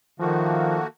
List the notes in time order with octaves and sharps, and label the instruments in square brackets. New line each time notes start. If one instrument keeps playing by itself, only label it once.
[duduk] D#3 [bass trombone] F3 [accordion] A3 A#3 F#4